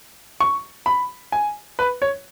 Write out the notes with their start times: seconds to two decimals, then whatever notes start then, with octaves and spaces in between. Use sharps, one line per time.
0.41 C#6
0.86 B5
1.32 G#5
1.79 B4
2.02 C#5